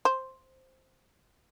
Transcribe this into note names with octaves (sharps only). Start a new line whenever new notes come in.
C5